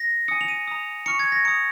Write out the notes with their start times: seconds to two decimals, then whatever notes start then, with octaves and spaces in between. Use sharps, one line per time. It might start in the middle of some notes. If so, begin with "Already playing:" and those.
Already playing: A#6
0.28 G#5 D#6 C#7
0.41 F7
0.48 D#7
0.68 A#5 D#6
1.06 A#5 C#6 F6 C#7
1.19 G#6
1.32 A#6
1.45 A#5 D#6 C#7